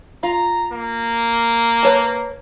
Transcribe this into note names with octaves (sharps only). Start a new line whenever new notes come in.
F4 A#5
A#3
B4 C#5 A5